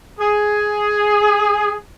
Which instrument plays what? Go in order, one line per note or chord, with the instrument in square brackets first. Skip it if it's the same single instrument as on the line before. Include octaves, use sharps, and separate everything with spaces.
[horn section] G#4